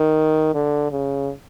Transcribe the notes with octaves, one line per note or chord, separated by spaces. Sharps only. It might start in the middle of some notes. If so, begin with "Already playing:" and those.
Already playing: D#3
D3
C#3